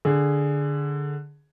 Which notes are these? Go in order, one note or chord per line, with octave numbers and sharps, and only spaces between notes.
D3 G#4